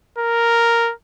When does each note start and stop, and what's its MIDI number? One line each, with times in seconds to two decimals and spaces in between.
0.19 0.92 70